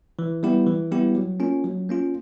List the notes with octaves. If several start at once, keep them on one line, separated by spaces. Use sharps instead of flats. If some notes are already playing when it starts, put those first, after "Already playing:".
E3
G3 B3 E4 G4
E3
G3 B3 E4 G4
F#3
A#3 C#4 F4
F#3
A#3 C#4 F4